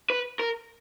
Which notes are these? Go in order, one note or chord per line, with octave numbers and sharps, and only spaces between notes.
B4
A#4